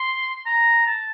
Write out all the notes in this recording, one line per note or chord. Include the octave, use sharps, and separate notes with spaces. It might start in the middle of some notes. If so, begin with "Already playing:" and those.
Already playing: C6
A#5
A5